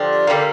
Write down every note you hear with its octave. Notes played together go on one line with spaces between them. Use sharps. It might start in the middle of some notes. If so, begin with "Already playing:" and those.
Already playing: D3 F3 D4 G4
D3 G3 A#3